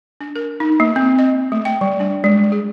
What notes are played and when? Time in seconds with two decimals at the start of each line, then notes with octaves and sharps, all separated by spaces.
0.21 D4
0.36 A#4
0.60 D#4
0.80 A#3
0.96 C4
1.19 D#5
1.52 A3
1.65 G5
1.81 G3
2.00 D4
2.24 G#3
2.52 G#4